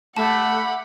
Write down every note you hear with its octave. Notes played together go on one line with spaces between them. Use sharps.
A3 G4 F#5 A5 B5